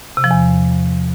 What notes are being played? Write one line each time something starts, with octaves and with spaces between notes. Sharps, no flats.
C3
F3
E2